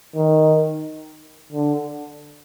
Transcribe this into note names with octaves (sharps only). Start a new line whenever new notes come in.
D#3
D3